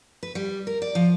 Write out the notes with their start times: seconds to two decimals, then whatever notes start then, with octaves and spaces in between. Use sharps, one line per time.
0.23 B4
0.35 G3
0.67 A#4
0.82 D5
0.95 F3